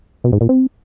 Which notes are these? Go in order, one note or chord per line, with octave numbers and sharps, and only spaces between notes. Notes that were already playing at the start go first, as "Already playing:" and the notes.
B2
G#2
A#2
C4